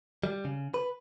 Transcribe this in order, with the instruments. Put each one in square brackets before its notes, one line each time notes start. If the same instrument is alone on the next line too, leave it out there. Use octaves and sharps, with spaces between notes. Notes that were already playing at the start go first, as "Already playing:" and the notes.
[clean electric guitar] G3
C#3
B4